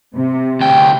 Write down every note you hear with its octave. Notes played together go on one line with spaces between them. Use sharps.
C3
D2 G5